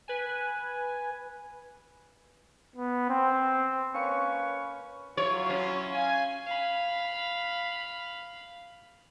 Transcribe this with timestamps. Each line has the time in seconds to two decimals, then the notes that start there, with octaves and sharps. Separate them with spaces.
0.08 B4 G#5
2.76 B3
3.09 C4
3.95 A#3 C#4 B4 C#5 C#6
5.17 F#3 E4 F4 C#5
5.50 C#4
5.92 F5 G#5
6.46 F5 B5